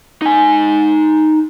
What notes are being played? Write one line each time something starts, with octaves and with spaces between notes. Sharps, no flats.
D#4 G#5